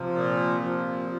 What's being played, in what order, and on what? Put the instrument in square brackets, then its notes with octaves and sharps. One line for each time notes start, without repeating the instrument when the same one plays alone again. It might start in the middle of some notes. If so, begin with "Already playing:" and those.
Already playing: [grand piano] C3 [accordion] F3
[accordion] A#2
F3